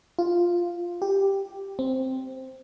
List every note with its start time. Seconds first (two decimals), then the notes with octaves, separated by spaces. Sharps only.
0.19 F4
1.02 G4
1.79 C4